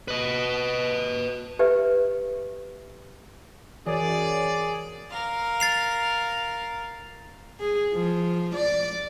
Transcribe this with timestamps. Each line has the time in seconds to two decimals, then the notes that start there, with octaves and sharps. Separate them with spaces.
0.08 B4 D#5
1.59 G4 A4 B4 E5
3.86 F#2 E3 G#4 D5
5.11 A#4 F5
5.60 A6 C7 F7
7.60 G#4
7.93 F3
8.56 D5